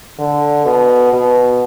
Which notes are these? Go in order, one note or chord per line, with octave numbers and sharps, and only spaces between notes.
D3
B2
B2